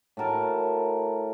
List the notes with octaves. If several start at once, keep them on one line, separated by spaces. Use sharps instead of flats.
A2 F#4 A#4 A5